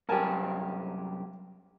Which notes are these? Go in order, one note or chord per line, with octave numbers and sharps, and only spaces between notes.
C2 F#2 G4 A#4 G#5 A5